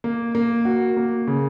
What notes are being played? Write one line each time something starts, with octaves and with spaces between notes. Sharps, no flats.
A#3
A#3
F#4
A#3
C#3